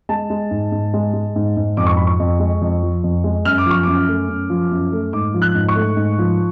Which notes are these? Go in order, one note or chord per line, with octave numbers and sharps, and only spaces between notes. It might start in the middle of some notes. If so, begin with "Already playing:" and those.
G#3 A5
G#3
G#2
G#2
G#3
G#3
G#2
G#2
F2 D6
C#6
F3 B5
C#6
F2
G#3
F2
F3
F2
G#3
F#2 F6
D6
F3 C#6
F#2 D6
A3
F#2
F3
F#2
A3
G#2 D6
F3
F#6
G#2
C#6
A3
G#2
F3